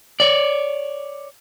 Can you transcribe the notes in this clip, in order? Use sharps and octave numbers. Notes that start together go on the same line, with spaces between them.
C#5 D5